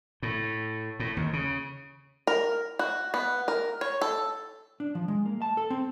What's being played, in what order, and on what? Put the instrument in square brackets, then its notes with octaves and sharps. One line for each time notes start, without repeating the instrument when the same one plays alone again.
[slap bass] A2
A2
D#2
C#3
[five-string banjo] A#4
F#4
B3
A#4
C#5
A4
[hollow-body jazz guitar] D4
F3
G#3
A#3
A5
A4
C4